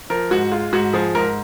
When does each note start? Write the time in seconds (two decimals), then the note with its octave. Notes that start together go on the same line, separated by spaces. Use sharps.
0.10 F3 A#4
0.31 G#2 F#4
0.52 G#3 F4
0.73 G#2 F#4
0.93 F3 G#4
1.15 G#2 A#4